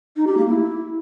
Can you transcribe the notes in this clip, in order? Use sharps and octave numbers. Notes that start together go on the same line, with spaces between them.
D#4
G4
A#3
E4